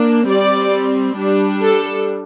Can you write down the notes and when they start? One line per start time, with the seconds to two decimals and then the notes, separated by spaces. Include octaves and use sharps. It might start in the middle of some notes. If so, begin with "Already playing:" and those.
Already playing: A#3 D4
0.28 G3 C4 D5
1.17 G3 D4
1.61 A4